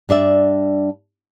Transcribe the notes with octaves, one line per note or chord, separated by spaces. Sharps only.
G2 D4 D5 E5